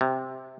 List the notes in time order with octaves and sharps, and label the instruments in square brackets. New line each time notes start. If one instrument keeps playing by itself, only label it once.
[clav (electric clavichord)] C3